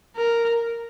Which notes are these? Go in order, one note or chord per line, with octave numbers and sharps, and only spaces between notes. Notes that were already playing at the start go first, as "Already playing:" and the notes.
A#4